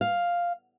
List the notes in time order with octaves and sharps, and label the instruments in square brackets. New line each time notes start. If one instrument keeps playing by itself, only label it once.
[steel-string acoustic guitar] F5